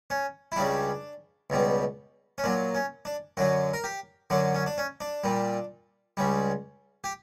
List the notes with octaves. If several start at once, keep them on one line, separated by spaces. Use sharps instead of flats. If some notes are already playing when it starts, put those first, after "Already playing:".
C#4
E4
C#2 C#3 G3 D4
C#2 B2 G3
C#4
A#2 F#3 D4
C#4
D4
F#2 D3 F#3 F#4
A#4
G4
F#2 D3 F#3 D4
C#4
D4
C#4
D4
A#2 G3
C#2 C#3 G3
G4